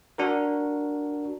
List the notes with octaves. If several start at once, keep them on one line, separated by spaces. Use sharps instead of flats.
D4 F#4 A#4